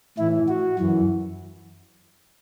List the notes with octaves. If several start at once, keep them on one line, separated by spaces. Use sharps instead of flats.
A2 E3 E4
F#4
F#2 E3